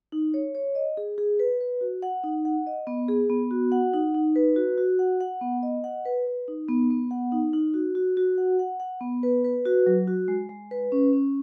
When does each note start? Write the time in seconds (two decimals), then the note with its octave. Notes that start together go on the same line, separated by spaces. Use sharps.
0.12 D#4
0.34 C#5
0.55 C#5
0.75 D#5
0.97 G#4
1.18 G#4
1.40 B4
1.61 B4
1.81 F#4
2.02 F#5
2.24 D#4
2.45 F#5
2.67 D#5
2.87 B3
3.08 G#4
3.29 B3
3.51 F#4
3.72 F#5
3.93 D#4
4.15 D#4
4.36 B4
4.56 F#4
4.78 F#4
4.99 F#5
5.21 F#5
5.41 B3
5.63 D#5
5.84 F#5
6.05 B4
6.27 B4
6.48 D#4
6.68 B3
6.90 B3
7.11 F#5
7.32 D#4
7.53 D#4
7.74 F#4
7.95 F#4
8.17 F#4
8.38 F#5
8.59 F#5
8.80 F#5
9.01 B3
9.23 B4
9.44 B4
9.65 F#4
9.86 F#3
10.07 F#4
10.28 G#3
10.49 G#3
10.71 B4
10.92 C#4
11.13 C#4